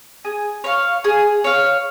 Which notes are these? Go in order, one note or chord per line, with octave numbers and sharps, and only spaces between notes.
G#4
C#5 F5
G#4
C#5 F5